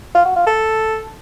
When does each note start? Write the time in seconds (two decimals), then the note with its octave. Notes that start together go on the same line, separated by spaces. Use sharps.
0.15 F4
0.25 F#4
0.36 F4
0.46 A4